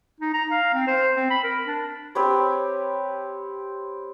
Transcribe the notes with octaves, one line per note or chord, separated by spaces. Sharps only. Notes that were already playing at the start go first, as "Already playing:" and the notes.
D#4
A#5
F5
C4
C5
C4
B5
A#4
D4
C4 G4 B4 C#5